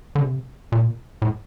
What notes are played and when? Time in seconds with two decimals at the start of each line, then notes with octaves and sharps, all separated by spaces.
0.15 D3
0.21 C3
0.72 A#2
1.22 A2